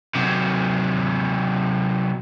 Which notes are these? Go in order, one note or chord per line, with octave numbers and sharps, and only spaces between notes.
C3 F#3